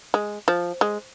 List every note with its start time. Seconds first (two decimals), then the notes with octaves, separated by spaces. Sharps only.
0.14 G#3
0.48 F3
0.81 G#3